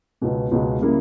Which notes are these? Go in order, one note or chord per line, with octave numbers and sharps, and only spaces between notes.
C#2 B2 G#3
C#2 B2 G#3
C#3 G3 A#3 E4